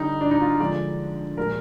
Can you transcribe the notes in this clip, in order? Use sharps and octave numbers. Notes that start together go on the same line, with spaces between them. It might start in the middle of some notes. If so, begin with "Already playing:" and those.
Already playing: D3 G3 D#4
D4
D#4
F4
D3 F3 G#3 D5
A#2 F3 G#3 A#4